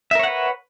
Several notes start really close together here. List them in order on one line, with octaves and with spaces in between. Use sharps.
E5 A#4 C#5 F#5 B4